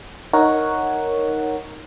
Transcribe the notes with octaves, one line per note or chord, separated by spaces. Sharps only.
D#4 A#4 C#5 F#5